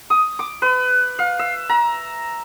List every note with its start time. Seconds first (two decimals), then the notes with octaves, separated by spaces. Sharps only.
0.10 D#6
0.39 D6
0.62 B4
1.19 F5
1.39 E5
1.69 A#5